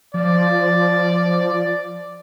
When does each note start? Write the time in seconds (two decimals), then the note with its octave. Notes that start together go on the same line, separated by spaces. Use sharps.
0.14 F3 D5